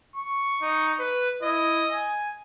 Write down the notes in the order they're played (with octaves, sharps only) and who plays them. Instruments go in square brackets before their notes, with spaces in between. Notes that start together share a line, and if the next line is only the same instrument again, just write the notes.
[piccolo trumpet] C#6
[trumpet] D#4
B4
[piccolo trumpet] E4 [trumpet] D#5
[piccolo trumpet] G#5